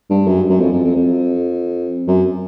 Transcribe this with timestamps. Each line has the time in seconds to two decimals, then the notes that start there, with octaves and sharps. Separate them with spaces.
0.10 G2
0.27 F#2
0.49 F#2
0.60 F2
0.73 F2
0.85 F2
0.96 F2
2.08 F#2